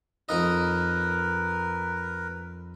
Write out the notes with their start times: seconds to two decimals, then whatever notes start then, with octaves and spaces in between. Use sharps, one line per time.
0.29 F2 D#4 A#4 B4 D#5